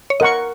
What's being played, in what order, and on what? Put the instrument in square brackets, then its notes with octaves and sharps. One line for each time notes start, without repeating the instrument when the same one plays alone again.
[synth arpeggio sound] C#5
[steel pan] A#4 F#5 C#6 [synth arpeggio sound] D#5